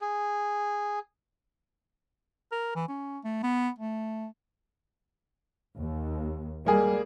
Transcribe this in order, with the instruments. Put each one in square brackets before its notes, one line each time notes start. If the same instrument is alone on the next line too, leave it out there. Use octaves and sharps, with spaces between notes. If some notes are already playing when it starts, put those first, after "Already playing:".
[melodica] G#4
[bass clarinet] A#4
E3
C#4
A3
B3
A3
[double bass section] D#2
[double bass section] G3 G#3 [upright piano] A#3 G#4